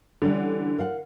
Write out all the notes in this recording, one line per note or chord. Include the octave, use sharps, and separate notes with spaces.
D3 E3 G3 C#4
A#4 F5 F#5